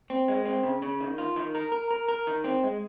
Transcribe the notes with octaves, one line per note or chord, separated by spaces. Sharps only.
C4
G#3
C4
C#3
C#3
D#3
F4
D#3
A#4
A#4
A#4
A#4
D#3
C4
G#3